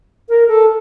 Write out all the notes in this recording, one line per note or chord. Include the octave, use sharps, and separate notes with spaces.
A#4
A4